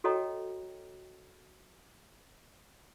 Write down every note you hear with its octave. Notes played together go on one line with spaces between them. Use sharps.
F#4 A4 C#5 D#5 G5 A#5